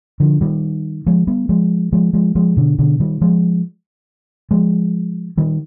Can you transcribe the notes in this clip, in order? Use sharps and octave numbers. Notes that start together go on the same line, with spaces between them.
D3 F3
D#3 G3
F3 G#3
G3 B3
F3 G#3
F3 G#3
F3 G#3
F3 G#3
B2 D3
B2 D3
D#3 G3
F3 G#3
F3 G#3
D#3 G3